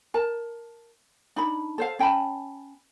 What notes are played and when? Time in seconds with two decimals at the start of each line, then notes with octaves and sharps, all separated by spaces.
0.14 A#4 A5
1.36 D4 D#4 B5
1.78 A4 C5 F5
1.99 C#4 G5 A5 B5